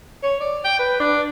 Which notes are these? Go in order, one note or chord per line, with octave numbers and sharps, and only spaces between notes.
C#5
D5
G5
B4
D4